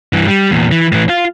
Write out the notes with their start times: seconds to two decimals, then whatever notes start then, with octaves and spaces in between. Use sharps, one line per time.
0.13 G2 E3
0.28 G3
0.51 E2 A#2
0.72 E3
0.92 A2 E3
1.09 F4